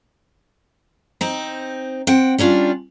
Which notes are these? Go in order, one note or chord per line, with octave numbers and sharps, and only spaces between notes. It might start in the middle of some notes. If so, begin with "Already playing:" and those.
C4 D#4
C4 F#5 G5
G3 C#4 D4 F4